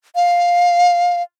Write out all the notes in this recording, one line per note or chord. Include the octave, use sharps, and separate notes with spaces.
F5